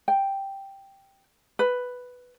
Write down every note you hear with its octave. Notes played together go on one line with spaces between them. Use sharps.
G5
B4